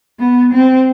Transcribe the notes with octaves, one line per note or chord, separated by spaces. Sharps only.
B3
C4